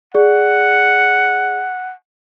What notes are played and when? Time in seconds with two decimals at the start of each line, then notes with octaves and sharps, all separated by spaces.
0.14 G#4 D5 F#5